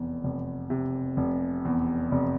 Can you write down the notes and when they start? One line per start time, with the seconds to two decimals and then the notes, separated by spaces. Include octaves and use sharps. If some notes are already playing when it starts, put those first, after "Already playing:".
Already playing: F1 E2
0.24 F1
0.70 C3
1.17 F1
1.65 E2
2.12 F1